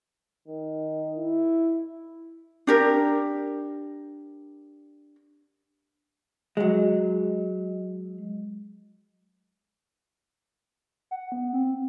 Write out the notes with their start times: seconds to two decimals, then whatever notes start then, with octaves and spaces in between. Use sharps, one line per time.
0.48 D#3
1.17 E4
2.67 D4 G4 A#4
6.57 F#3 G#3
11.11 F#5
11.32 B3
11.53 C4